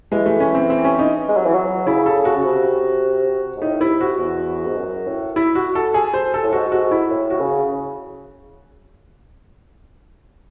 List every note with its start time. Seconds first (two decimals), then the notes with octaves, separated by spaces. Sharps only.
0.12 E3 G#3
0.26 A3
0.40 C#4
0.55 C4
0.70 C4
0.84 C#4
0.99 D#4
1.29 G#3
1.37 F#3
1.46 E3
1.54 F#3
1.87 C#3 E4
2.06 A4
2.25 F#4
2.37 C#3
2.44 C3
3.57 G#2
3.62 A2 D#4
3.81 C3 E4
3.99 C3 F#4
4.19 E2
4.67 G#2
4.77 F#2
5.07 A2
5.36 E4
5.55 F#4
5.75 A4
5.94 G#4
6.14 C5
6.34 A4
6.43 A2
6.52 G#2 F#4
6.72 F#4
6.91 E4
7.11 A2
7.30 F#4
7.40 C#3